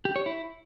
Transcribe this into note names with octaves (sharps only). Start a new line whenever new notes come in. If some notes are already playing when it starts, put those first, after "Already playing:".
G4
C#5
E4